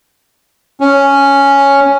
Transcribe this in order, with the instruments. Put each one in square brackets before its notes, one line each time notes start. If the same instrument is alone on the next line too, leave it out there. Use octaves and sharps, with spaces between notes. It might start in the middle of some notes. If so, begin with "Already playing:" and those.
[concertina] C#4